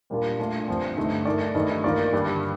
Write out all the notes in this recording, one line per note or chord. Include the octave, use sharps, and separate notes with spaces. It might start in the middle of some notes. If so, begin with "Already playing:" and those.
A#2 G3 A#3 D4 F4
A3 D4 F4
G2 F3 C4
G2 D3 A3 D#4
A3 D#4 A#4 D5
G2 D#3 A3 D#4 G4
D#3 A#3 F4 A#4 D5
G2 D3 G3 D4